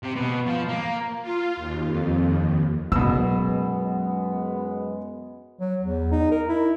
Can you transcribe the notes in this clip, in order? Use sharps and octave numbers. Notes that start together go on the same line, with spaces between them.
C3
B2
F3
A#3
F4
D#2
F2
D#2
F#2 B2 F#3 G#3 B3 E6
F#3
E2
D#4
A#4
E4